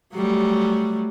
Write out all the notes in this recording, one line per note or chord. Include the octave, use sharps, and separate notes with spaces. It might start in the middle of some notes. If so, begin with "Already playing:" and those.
F#3 G3 A3